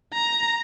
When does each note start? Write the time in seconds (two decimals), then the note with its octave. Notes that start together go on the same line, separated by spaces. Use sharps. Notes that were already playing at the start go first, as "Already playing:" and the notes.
0.14 A#5